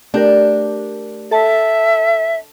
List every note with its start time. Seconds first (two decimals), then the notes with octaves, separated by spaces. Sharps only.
0.14 A3 D4 G4 A#4
1.31 A4 E5 A5